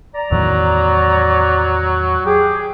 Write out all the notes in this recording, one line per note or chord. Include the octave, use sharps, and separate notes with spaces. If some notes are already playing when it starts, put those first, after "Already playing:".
D5 A#5
E2 A2 D#3 F#3
G4 G#4